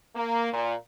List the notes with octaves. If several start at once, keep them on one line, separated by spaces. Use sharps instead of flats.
A#3
A#2